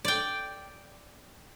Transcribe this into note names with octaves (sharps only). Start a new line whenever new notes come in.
D5 G5